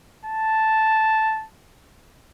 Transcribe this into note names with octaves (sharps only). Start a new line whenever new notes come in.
A5